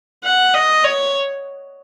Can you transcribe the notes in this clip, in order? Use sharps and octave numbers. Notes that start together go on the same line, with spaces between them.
F#5
D#5
C#5